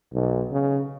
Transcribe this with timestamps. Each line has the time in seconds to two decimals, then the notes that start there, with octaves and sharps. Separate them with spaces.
0.13 B1
0.51 C#3